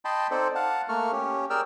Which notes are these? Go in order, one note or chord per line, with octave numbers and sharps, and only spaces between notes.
D#5 G5 A5 B5 C6
C4 D#4 A4 C5 D5
F5 F#5 A5
A3 A#3 C#6 F6
C#4 G4
G#4 A#4 D5 G5 E6 F6